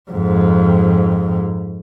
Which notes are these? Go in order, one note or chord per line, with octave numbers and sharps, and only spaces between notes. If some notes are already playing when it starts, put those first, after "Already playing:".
F2 G#2